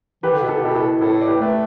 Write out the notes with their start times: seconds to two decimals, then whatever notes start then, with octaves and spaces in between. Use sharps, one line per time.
0.23 E3 G4 B4
0.33 D3
0.42 B2
0.49 D3 A4
0.58 G4
0.63 B2 E4 A4
0.75 E4 A4
1.01 A2 E4 A4
1.21 D5
1.28 G4 B4
1.41 A3 B4